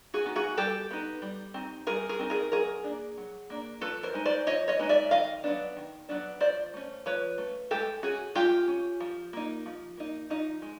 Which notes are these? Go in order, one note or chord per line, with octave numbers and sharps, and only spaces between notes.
F#4 G#4
B3 D#4
F#4 G#4
G3 G4 A4
B3 D#4
G3
C4 D#4
G3 G#4 A#4
G#4 A#4
C4 D#4
G#4 A#4
F#3 G#4 A#4
A#3 D4
F#3
A#3 D4
F3 A4 B4
A#4 C5
G#3 B3 D#4
C5 D5
F3 C#5 D#5
C#5 D#5
G#3 B3 D#4
D5 E5
D#3 D#5 F5
F#3 B3 D4
D#3
F#3 B3 D4
F3 C5 D5
A3 C#4
F3 B4 C#5
A3 C#4
G#3 G4 A4
C#4 F#4 G#4
G#3 F4 G4
C#4
F3
A#3 D#4
F3
A#3 D#4
F3 D#4
G#3